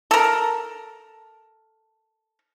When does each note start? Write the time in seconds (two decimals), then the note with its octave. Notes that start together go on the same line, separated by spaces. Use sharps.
0.11 A4 A#4